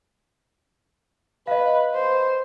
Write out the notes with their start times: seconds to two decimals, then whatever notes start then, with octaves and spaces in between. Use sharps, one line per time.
1.47 B4 D#5 F5
1.94 C5